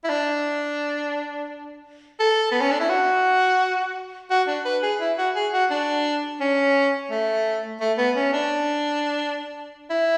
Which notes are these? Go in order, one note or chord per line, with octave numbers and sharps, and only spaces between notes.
E4
D4
A4
B3
C#4
D4
E4
F#4
F#4
D4
B4
G#4
E4
F#4
G#4
F#4
D4
C#4
A3
A3
B3
C#4
D4
E4